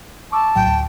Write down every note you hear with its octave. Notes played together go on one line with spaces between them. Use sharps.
A5 C#6 D6 E6
A#1 A2 F#3 G5
D2